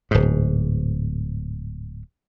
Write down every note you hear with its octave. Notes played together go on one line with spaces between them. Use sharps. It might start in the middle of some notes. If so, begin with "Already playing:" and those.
D1 G#2